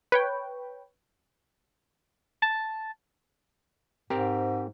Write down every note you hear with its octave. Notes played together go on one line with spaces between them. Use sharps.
B4 C#5 G5
A5
G#2 C4 G4 A#4